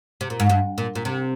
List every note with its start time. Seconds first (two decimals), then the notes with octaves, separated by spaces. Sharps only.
0.21 C3
0.30 A#2
0.40 G#2
0.50 G2
0.78 A#2
0.95 A#2
1.05 C3